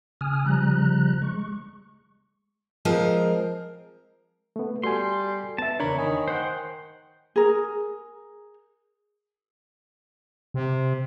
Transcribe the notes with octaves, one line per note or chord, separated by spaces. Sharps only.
C#3 G#5 D#6 F6
C#3 F3 G3 A#5 F#6
G#3 C#6
F3 G#3 C4 A#4
A3 B3
G3 F#4 A4 G#5 C6
B3 E5 A5
E2 C#3 D4 A#4 C#5 B5
D#3 G#5
C5 F#5 G5
G#4 A#4
C3